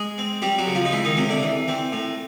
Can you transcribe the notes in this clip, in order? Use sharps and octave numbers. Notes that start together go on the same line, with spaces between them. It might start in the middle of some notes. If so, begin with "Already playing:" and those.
Already playing: G#3 G#4
C4
G3 C4 G4
F#3 F#4
C#3
F3 F4
D#4
E3 G#3 E4
D#3 D#4
C3 C#4
D3 D4
E3
E3 C4
A2